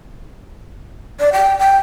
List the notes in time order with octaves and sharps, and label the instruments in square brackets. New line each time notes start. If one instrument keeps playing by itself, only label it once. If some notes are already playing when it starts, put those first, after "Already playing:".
[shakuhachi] D5
G5
G5